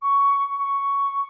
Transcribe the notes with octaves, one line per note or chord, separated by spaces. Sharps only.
C#6
C#6